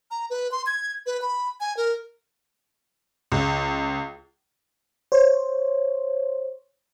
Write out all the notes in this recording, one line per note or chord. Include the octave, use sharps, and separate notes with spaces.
A#5
B4
C6
G#6
B4
B5
G#5
A#4
C#2
C5 C#5